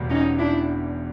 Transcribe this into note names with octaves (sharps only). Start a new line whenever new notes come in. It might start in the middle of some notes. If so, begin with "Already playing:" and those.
Already playing: E1 E2 B2 G3 A#3
C#4 D#4
D4 E4